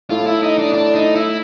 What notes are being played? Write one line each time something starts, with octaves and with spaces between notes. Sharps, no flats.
A2 F4
E4
D#4
D4
D4
D#4
E4